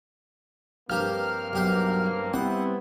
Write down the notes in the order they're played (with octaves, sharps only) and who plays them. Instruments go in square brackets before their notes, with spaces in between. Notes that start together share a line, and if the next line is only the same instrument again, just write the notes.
[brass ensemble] G2 A#3 C4 [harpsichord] F3 G4 [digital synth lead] F6
[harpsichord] B1 G4 C6
[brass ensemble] G3 B3 E4 [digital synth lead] C4 [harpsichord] F#5